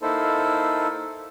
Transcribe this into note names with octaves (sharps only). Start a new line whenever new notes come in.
A#3 D#4 E4 A4 C5